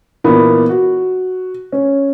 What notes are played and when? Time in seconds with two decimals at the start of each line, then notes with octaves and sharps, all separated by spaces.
0.24 A#2 E3 B3
0.69 F#4
1.72 C#4